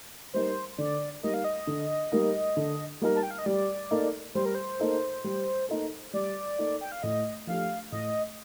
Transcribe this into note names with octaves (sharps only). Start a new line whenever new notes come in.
G3 A#3 D#4 A#4 C5
D3 D5
G3 A#3 D#4 A#4 D#5
F5
D#5
D3
G3 A#3 D#4 A#4
D3
G3 A#3 D#4 A#4
A5
G5
F5
D#5
G3 D5
A#3 D#4 A4
G3 C5
A#4
C5
A#3 D#4 A4
G3
A#3 D#4 A4
G3 D5
A#3 D#4 A4
G5
F5
A2 D#5
F3 A3 D4 G4 F5
A2 D#5